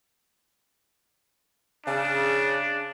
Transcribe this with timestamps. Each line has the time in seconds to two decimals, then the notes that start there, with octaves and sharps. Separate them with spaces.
1.86 C#3 D4